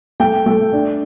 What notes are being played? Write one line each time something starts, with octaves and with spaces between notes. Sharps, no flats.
A3 G5
A3
D4